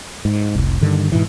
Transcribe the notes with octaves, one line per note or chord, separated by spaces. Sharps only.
G#2
F1 C2
G2 D3 D#3
G#2 B2 E3